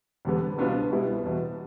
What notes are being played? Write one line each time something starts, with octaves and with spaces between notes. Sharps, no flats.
E2 D3 G3 B3
C2 B2 B3 D4 F4
C2 B2 G3 B3 E4
E2 B2 B3